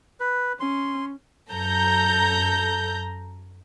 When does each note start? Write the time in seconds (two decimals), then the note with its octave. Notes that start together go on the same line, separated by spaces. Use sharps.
0.20 B4
0.60 C#4 C6
1.51 F#2 A4 A#5 G6